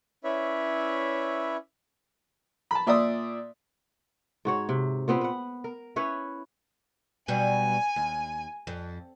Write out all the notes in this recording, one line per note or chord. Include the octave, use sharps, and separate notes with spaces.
C#4 E4 B4 C#5 D5 E5
A5 B5
A#2 D5 E5 C6 D#6
G#2 F#4 C#5
C3
A#2 B3 C4 B4
B4 F#5
A#4
C#4 E4 B4 C#5
B2 F#3 G3 G#5
D#2
F2